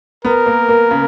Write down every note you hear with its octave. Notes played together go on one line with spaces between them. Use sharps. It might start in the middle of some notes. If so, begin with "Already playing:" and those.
B3 A#4
A#3
A#3
C#3